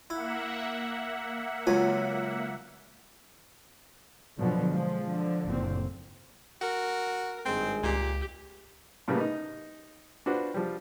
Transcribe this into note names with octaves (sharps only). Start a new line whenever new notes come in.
A#3 E4 E5 F#5
C#2 F#3 F4 G#5
B2 D3 F3 F#3
F3 G#3
D3
F#1 A#2 C4
F#4 A#4
G#1 G2 G#3 C4
C#2 A#2 G4
A2 C#3 G3 A#3 B3
D#4
D4 F4 F#4 B4 C5
F3 G3